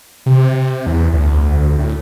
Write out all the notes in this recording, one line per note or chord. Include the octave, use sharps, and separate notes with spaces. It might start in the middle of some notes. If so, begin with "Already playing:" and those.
C3
E2
D2
A2